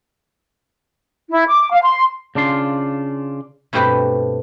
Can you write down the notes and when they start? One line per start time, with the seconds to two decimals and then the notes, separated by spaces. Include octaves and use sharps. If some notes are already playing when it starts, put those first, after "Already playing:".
1.30 E4
1.46 D6
1.71 F5
1.83 C6
2.35 C#3 D4 F4 C6
3.73 G2 B2 A3 C4 G4 B4